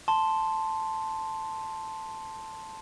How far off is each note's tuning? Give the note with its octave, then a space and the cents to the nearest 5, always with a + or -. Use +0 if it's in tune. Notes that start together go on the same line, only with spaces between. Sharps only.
A5 +0 C6 +0